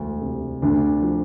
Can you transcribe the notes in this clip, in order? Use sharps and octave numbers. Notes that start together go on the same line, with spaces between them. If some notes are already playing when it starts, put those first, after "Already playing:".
Already playing: E1 D2
C3
D2 D4
F3